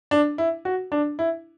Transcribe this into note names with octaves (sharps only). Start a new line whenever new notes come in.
D4
E4
F#4
D4
E4